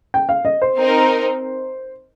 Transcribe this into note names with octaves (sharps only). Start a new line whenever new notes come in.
G5
F5
D#5
C5
C4 D#4 A#4